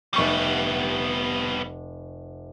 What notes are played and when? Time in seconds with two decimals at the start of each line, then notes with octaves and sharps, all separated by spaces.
0.14 F1 G3 B3 C#6 D#7